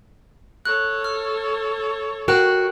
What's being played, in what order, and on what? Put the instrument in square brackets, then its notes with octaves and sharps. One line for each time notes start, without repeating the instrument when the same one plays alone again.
[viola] A4 C#5 [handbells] F#6
[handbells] F6
[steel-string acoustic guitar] F#4 [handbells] A#4 G5 F#6